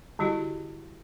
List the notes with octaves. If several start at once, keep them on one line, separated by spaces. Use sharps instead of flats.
D3 G3 E4 F#4 G4